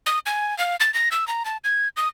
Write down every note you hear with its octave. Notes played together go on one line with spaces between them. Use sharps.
D#6
G#5
F5
A6
A#6
E6
A#5
A5
G#6
D#6